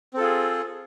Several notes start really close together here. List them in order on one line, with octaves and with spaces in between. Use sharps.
C4 A4 F4 G#4